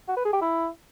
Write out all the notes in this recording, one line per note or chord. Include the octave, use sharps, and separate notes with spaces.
F#4
B4
G#4
G4
E4